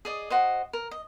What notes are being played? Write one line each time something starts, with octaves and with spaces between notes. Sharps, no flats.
G#4 D5 D#5
F#4 C5 D#5
A#4
D#5